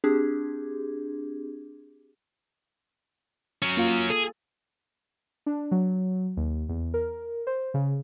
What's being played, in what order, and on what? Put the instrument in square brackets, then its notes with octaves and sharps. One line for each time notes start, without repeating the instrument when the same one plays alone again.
[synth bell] C4 D4 G4 G#4
[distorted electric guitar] F#3 C#4
[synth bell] A#3 F4 F5
[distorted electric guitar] G#4 [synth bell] A4
[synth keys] D4
F#3
D#2
E2
A#4
C5
C#3